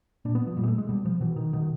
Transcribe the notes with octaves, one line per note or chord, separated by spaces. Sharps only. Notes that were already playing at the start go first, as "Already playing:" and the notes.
A#2 D4
B3
F3
A#2 G3
G#3
A3
G#3
B2 G3
F3
B2 E3
D#3
B2 D#3